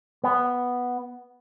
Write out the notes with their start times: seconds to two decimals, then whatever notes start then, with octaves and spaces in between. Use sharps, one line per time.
0.24 B3